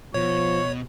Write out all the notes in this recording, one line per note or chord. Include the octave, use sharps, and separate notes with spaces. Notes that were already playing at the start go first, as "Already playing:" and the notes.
B2 F3 C#5 C#6